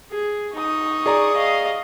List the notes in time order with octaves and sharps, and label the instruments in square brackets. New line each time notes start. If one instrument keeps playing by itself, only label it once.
[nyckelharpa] G#4
[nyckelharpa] D#4 [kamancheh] C#6 D#6
[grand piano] G#4 D5 A#5
[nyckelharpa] D#5 F5